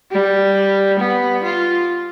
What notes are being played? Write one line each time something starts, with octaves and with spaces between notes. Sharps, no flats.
G3
B3
F4